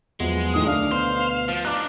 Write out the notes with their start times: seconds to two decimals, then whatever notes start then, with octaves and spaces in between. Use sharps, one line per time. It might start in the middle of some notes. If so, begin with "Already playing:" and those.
0.20 E2 F3 F#3 G#3 B3
0.54 A2 D#3 E3 D#6
0.66 D2 D4 F5
0.92 B2 C5
1.49 F3
1.65 D4 D#4 D6 F#6